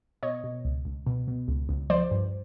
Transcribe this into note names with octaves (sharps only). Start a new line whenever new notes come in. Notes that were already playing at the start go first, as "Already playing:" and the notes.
B2 C#5 D#5
B2
C#2
C#2
B2
B2
C#2
C#2
F3 C5 D5
G2